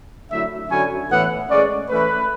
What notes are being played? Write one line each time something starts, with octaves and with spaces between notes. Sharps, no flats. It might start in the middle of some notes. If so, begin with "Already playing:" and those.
D3 F#3 A3 E4 E5
D3 F#3 C#4 E4 G#5
A2 E3 B3 E4 F#5
A2 G#3 C#4 D5
E3 A3 C#4 E4 B4